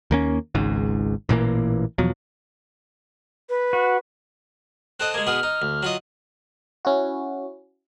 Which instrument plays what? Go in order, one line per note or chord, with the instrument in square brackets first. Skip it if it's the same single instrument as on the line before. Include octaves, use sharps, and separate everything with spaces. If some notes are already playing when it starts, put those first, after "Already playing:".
[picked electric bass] D#2 A#3 C#4
G#1 C#2 G#2
A1 A#2 E3 A#3
E2 B2 F3 F#3
[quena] B4
[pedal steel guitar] F#4
[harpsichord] C4 A4 D#5 [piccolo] F#6
[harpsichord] G#3 A#3 [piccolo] G#6
[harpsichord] B2 B3 G#4 [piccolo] F6
[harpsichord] D#4
D2
F#3 F4 D#5
[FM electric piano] C#4 E4 F#4